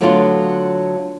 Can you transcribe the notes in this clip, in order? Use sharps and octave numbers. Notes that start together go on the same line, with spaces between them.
D3 F#3 A3 B3 D4 F4